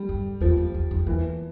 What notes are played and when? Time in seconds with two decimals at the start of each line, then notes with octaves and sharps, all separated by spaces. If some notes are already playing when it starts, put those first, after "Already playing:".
Already playing: G3
0.09 G2
0.41 E2 F3
0.57 F2
0.74 E2
0.91 F2
1.06 E2 E3